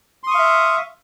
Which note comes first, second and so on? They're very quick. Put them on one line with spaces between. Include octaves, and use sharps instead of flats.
C6 D#6 C#6 F5 E5